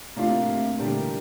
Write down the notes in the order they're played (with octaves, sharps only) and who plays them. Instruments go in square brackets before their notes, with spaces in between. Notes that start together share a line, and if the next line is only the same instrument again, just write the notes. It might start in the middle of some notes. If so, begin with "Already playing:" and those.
[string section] A2 C3 [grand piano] A#3 D4 F4
[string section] A2 C3
[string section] A#2 D3 [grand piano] E3 G3 D4 G4 A#4